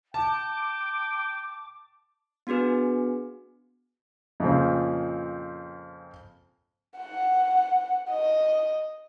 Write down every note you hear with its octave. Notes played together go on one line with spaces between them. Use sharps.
G5 A5 D6
B3 D4 F#4 G#4 B4
F2 A#2 C#3 C4
F#5
D#5